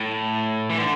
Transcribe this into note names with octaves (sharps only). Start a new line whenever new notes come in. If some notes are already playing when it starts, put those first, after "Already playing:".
Already playing: A2
E3
D3